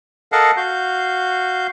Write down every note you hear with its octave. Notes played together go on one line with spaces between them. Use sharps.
A4 A#4 D#5 F5 F#5 A5
F#4 F5 G6